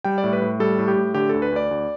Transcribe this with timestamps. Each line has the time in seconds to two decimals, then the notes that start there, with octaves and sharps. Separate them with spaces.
0.04 G3 G5
0.18 D5
0.24 A2
0.33 B4
0.42 A2
0.60 G3 A4
0.79 A2
0.88 G4
0.96 A2
1.14 D3 G4
1.29 D2 A4
1.42 B4
1.52 D2 D5
1.71 D2